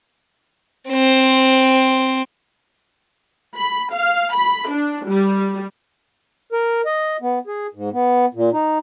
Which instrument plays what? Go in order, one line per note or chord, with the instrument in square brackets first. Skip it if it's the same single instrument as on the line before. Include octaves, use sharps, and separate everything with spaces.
[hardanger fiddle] C4 C5
[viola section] B5
F5
B5
D4
G3
[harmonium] A#4
D#5
B3
G#4
G#2
B3
A#2
D#4